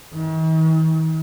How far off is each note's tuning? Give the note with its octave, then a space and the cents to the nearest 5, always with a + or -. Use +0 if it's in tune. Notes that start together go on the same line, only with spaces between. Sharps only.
D#3 +45